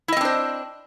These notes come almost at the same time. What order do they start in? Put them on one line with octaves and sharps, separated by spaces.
E4 D#5 C4 D4 C5